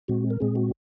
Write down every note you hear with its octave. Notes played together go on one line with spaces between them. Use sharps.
A#2 G#3 C4 F#4
A#4
A#2 G#3 C4 G#4
F#4